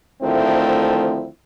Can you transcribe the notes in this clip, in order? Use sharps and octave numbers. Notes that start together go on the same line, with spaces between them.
D2 D#3 F3 A3 C4 E4